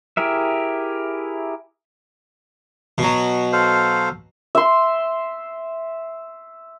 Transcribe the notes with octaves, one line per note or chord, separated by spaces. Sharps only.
E4 G4 G#4 A#4 E5
B2 F#3
A4 C5 F5
E5 C6